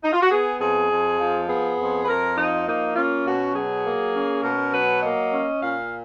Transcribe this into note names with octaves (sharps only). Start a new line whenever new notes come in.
D#4
F4
F#4
B3 G#4
F2 G#4
F2
F3
B3 G#4
F2
B4
F2 A#4
F3 D#4
A#3 D#4
C#4 F4
B2 F#4
F#3 G#4
A#3
C#4
B2 A#4
F#3 B4
A#3 D#5
C#4
A#2 F5